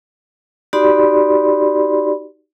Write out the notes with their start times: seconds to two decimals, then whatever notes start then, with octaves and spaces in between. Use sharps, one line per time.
0.73 D#4 F#4 G4 D5 B5 C6